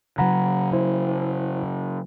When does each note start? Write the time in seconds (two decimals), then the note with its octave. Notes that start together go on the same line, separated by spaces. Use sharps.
0.18 C#3 F#3 F#5 A#5 B5
0.73 E4 C5